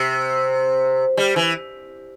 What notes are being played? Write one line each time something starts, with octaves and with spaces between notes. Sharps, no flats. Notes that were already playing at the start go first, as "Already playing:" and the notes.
Already playing: C3
G3
E3